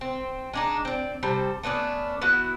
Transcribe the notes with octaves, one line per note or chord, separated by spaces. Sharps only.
C4
G#3 D4 D#4
C4 D5
C3 G3 A4 C5
A3 B3 C#4 D4
B3 E4 F#4